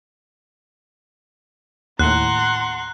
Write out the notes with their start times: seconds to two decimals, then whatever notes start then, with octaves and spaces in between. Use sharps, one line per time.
1.99 D#2 A2 F#5 A#5 C6 F#6